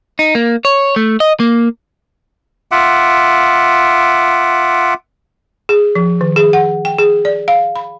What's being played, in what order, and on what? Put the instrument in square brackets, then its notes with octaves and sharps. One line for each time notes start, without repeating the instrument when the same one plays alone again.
[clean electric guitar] D#4
A#3
C#5
A3
D#5
A#3
[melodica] F4 E5 F#5 D6
[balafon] G#4
F3
D#3
G#4
F#5
G5
G#4
D5
F5
B5